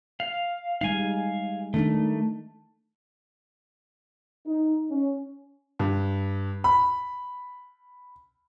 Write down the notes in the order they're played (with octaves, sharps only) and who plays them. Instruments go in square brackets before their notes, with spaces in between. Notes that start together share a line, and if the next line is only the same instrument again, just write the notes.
[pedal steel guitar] F5
[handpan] G3 G#3 D#4 [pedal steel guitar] F5 G#5
[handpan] D#3 D4 D#4 [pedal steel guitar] A3
[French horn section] D#4
C#4
[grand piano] G2
B5